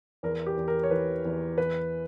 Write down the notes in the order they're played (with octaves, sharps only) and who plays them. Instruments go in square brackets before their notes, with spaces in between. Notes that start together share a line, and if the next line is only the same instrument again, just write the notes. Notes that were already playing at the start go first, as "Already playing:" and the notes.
[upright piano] E2 A#4
G4
E2
A#4
C#5
E3 B4
E2
E3 B4